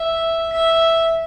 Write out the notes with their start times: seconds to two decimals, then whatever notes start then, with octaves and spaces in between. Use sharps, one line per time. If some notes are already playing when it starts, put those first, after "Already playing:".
Already playing: E5
0.52 E5